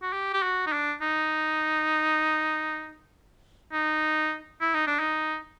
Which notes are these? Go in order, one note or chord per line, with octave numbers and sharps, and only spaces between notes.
F#4
G4
G4
F#4
D#4
D4
D#4
D#4
E4
D#4
D4
D#4